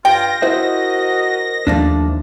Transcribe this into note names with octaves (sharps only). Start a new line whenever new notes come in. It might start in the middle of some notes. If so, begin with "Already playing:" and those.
G2 F4 G5 A#6
E4 F#4 A#4 C5 D#5 E5
D#2 F3 A3 D4